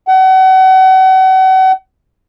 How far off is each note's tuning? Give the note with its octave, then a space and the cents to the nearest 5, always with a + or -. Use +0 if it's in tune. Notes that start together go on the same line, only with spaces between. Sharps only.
F#5 +35